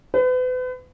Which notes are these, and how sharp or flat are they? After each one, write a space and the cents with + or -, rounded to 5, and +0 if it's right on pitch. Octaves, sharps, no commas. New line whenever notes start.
B4 +40